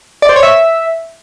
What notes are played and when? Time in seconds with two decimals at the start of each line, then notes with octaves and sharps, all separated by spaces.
0.22 D5
0.29 C5
0.36 C#5
0.43 E5